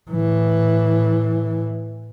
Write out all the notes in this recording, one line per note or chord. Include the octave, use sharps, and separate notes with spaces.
A2 E3